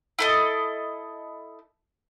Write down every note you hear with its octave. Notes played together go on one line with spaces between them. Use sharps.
E4 A4 D#5